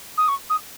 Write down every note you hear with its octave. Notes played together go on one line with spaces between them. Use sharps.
D#6
C#6
D#6